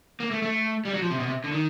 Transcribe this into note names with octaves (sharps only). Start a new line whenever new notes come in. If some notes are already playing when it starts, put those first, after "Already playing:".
A#3
A3
A3
G3
F#3
F3
C3
B2
C3
D3
D#3